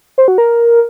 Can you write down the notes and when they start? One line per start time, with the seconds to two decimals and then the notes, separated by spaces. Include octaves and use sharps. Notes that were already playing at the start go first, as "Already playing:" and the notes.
0.18 C5
0.28 F#4
0.38 A#4